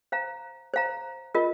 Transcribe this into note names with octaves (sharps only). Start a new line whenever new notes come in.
C5 F5 A#5
C5 F5 A#5
F4 A#4 D#5